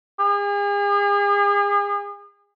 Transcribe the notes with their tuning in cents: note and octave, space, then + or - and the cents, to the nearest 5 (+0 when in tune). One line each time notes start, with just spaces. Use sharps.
G#4 -40